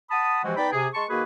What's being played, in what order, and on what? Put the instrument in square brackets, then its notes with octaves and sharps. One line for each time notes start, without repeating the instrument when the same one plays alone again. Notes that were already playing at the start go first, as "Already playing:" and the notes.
[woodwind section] F#5 A5 B5 D#6
C3 E3 F3 G#3 C4 F#4
B3 D#4 D5 G5 A5 B5
C3 G#4
G#3 A5 C6 C#6
D#3 A#3 F#4 G#4 B4